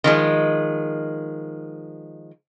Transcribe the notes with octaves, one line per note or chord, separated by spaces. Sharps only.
D#3 F3 G#3